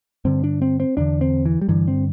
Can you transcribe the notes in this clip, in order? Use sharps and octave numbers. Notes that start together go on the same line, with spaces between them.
G2 D3 C4
D4
C4
C4
E2 D3 D4
C4
E3
G3
G2 D3 E3
C4